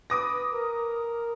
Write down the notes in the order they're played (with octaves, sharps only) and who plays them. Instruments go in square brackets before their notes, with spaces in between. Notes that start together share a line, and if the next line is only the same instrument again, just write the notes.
[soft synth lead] B4 [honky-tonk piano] D6 D#6 A#6
[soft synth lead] A#4